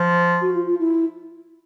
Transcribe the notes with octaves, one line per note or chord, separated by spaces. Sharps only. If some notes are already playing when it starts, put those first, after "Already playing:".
Already playing: F3
F#4
F4
F4
E4